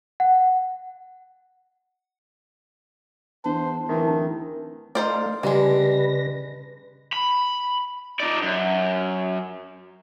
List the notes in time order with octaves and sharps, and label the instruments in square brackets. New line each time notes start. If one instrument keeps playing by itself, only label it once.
[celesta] F#5
[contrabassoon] E2 [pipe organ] D4 [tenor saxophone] C5
[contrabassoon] D1 [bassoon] D#3 [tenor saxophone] E3
[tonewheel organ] A3 F5 [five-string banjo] D#4 C5 D5
[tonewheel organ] C#3 B4 A#6 [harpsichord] G3 [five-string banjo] G#3 D4
[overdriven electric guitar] B5
D#4 D5
F#2